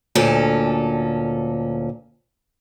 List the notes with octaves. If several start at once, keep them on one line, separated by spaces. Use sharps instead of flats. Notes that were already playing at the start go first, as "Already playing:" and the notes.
D2 A#2 C#4 A4